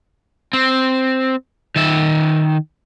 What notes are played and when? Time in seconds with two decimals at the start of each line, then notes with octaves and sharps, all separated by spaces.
0.53 C4
1.76 D#3 E5